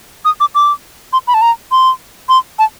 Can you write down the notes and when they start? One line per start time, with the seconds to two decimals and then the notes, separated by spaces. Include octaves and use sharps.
0.25 D#6
0.40 D6
0.55 D6
1.13 C6
1.27 B5
1.34 A5
1.42 A#5
1.71 C6
2.29 C6
2.59 A5